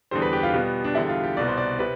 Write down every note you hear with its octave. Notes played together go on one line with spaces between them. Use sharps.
E2 D3 G3 C5
B4
G4
F4
B2 G3 B3
D4
E2 D3 G3 E4
F4
G4
C2 B2 B3 D5
C5
D5
C3 B4